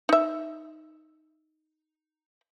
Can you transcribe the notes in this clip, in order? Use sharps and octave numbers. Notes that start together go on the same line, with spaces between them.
D#4 E5